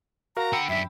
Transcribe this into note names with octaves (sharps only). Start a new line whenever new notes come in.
F#4 A#4 F5 A#5
D3 F#5 G5 B5 E6
F#2 D4 E5